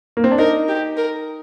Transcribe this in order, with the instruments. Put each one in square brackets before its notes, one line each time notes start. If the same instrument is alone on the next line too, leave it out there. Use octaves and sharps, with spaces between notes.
[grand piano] A#3
C4
D4
[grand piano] D#4 [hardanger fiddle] A#4
[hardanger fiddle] G4
A#4